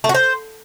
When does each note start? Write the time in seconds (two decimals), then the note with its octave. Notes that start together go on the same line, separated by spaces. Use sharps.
0.04 A3
0.09 F#4
0.15 C5